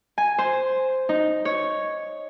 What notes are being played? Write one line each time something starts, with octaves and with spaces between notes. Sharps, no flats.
G#5
C5
D#4
C#5